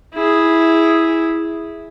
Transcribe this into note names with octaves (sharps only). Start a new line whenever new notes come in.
E4 G#4